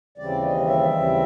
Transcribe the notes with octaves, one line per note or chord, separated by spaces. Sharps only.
D#2 C#3 E3 G3 C4 D5
D#5
E5
D#2 C#3 E3 G3 C4